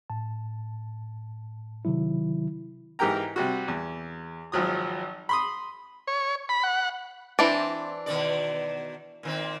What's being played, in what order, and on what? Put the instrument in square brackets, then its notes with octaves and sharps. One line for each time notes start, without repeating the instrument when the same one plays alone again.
[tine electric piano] A2 A5
C3 D#3 F#3 E4
[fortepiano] G#2 E3 G4 A#4 G5 A#5
C3 G3 F#4
E2
G#1 F3 F#3 D#6
B5 C6 D#6
[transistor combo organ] C#5
B5
F#5
[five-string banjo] E3 D4 [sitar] C4
[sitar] B2 D#3 D5
A#2 D#3 C4